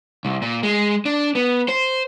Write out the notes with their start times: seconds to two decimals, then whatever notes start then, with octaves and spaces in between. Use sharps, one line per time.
0.25 C2
0.42 A#2
0.63 G#3
1.05 D4
1.35 B3
1.69 C5